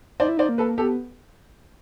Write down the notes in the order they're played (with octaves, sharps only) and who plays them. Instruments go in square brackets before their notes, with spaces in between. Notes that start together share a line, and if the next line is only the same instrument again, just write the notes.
[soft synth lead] D#4 [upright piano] C5 D5
[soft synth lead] E4
[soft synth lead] D#4 [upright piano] C5 D5
[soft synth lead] A#3
[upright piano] A4 B4
[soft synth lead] B3 [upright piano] G4 A4